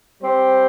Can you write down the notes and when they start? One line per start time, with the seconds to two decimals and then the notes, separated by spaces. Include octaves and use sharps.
0.22 G3 C4 G4 C5